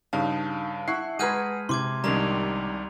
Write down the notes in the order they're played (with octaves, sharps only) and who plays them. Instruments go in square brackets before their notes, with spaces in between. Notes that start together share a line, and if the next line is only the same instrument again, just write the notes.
[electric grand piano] G2 C#3 F5 [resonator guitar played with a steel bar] D#4 [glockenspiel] A5
[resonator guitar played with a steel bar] E4 [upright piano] F#5 [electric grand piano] C#6 F#6 C7
[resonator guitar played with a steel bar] G#3 G#4 B4 [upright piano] F#5 A#5 [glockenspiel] F6 G6 D#7
[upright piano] C3 [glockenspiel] C6 D6 G#6
[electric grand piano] C2 D#3 G3 [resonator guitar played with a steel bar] G#3 C#4 D4 [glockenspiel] A#5 F7